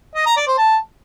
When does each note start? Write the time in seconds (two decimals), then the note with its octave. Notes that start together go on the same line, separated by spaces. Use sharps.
0.15 D#5
0.26 A#5
0.37 D5
0.47 C5
0.58 A5